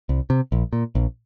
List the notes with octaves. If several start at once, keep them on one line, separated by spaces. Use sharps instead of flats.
C2
C3
A#1
A#2
A#1